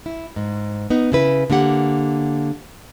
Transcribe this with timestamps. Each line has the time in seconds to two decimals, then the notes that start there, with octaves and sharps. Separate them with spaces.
0.06 E4
0.36 G#2
0.90 B3 D#4
1.12 C#3 E4 B4
1.50 D3 A#3 G4 F#5